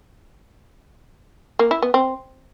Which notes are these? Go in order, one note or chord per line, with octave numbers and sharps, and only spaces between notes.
A#3
E4
B3
C4